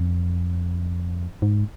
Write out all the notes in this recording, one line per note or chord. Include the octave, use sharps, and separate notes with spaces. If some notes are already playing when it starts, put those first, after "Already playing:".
Already playing: F2
G#2